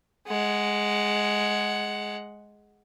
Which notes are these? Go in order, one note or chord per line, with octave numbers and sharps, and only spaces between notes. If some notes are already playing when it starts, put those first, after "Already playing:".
G#3 F#5